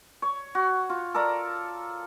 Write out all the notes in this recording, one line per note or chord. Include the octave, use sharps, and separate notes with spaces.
C#5
F#4
F4
A4 A#4 D5 A#5